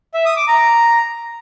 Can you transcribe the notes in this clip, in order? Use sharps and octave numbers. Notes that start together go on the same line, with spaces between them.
E5
D#6
D6
A#5